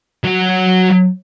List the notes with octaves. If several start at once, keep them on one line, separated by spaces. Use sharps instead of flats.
F#3 F#4